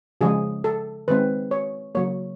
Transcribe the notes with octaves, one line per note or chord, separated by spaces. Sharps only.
C#3 F3 G#3 G#4
A4
D#3 G#3 C4 B4
C#5
C#3 F#3 A#3 C#5